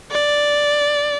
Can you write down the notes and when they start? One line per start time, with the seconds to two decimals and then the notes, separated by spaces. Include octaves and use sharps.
0.11 D5